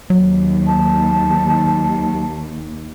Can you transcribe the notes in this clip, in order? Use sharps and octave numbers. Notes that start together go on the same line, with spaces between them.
D#2 F#3
A5